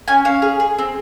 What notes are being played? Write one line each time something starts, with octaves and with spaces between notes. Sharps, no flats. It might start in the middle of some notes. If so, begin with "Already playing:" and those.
C#4 G#5
C#4 F5
G#4
G#4
C4